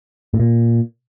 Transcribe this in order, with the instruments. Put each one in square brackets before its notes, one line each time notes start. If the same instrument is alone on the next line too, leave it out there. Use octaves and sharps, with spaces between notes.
[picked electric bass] A2
A#2